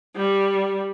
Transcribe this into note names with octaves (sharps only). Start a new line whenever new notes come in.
G3